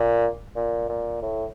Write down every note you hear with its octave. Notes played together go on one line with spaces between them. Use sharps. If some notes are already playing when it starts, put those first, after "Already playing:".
Already playing: A#2
A#2
A#2
A2